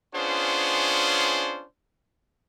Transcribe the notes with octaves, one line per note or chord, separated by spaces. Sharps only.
B3 C#4 D4 F4 G#4 C5